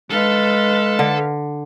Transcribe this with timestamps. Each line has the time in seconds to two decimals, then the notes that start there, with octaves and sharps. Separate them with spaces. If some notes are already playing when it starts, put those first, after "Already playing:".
0.11 G#3 A4 B4 F5 A5
0.99 D3